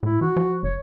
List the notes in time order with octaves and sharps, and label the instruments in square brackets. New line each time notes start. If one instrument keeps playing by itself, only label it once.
[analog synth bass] A2 [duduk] E4
[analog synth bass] E3 [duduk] F#4
[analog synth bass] F3
[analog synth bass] F#1 [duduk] C#5